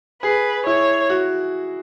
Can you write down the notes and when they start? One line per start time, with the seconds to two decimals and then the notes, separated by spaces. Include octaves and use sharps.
0.23 G#4 B4
0.66 E4 C#5
1.10 F#4